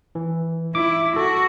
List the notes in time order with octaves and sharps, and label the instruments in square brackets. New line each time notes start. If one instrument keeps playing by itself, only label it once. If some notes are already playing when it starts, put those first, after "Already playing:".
[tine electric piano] E3
[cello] E4 [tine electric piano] D6
[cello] F#4 [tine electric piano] A4